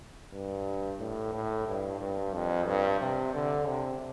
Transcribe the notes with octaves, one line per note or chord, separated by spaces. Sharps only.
G2
A2
A2
G2
G2
F2
G2
C3
D3
C3